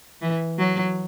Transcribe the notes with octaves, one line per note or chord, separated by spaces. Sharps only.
E3
F#3